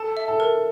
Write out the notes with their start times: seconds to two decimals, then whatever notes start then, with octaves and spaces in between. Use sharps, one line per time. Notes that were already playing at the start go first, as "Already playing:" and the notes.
Already playing: A4 A5
0.17 E5
0.28 A4
0.40 A#4